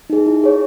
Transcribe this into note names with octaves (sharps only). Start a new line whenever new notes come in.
D#4 G#4
E4
G#4 C#5